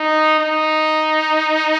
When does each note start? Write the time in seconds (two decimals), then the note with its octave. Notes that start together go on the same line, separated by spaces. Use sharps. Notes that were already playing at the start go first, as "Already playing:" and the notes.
Already playing: D#4
0.39 D#4